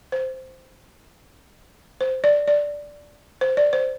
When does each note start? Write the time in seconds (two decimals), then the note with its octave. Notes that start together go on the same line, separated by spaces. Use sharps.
0.12 C5
2.01 C5
2.24 D5
2.48 D5
3.41 C5
3.57 D5
3.73 C5